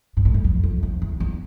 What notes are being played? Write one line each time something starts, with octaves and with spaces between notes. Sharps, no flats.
G#2
A2
F#2
F2
F2
F2
E2
E2